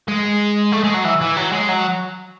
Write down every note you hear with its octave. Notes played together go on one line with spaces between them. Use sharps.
G#3
A3
G#3
F#3
E3
E3
F#3
G#3
F#3